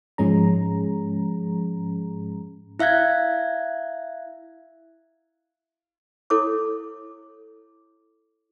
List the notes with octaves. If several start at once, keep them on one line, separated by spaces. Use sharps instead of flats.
G#2 F3 G#3 C#4 G#4 A#5
E4 E5 F5 F#6 G#6
E4 A4 C#5 D6